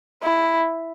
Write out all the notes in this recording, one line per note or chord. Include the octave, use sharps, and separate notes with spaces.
E4